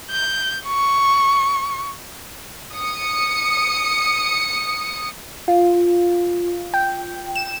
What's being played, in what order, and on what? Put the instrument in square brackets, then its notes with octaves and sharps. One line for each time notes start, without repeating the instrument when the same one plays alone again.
[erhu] G6
C#6
[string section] D#6 C#7
[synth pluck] F4
G5
E7